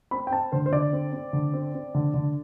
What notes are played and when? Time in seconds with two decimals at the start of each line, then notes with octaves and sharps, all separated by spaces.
0.11 C4 B5
0.27 G5
0.31 C4 A5
0.52 D3 C5
0.66 C5
0.72 D3 D5
0.93 C4
1.12 C4
1.33 D3
1.53 C4
1.74 C4
1.94 D3
2.14 D3